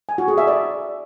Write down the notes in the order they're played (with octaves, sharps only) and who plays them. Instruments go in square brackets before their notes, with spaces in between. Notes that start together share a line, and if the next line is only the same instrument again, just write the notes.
[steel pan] G#5
F#4
G#4
E5
D5